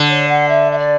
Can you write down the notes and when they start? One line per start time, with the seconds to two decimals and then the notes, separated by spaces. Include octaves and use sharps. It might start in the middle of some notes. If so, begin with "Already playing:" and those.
Already playing: D3
0.09 C#5
0.28 F#5
0.48 E5
0.72 E5
0.78 D5